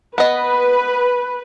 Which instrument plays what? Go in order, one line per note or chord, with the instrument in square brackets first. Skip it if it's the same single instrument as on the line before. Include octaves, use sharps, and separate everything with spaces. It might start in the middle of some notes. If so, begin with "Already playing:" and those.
[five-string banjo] B3 D#5 [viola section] B4